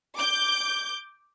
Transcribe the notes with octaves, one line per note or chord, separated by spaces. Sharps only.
D6 G6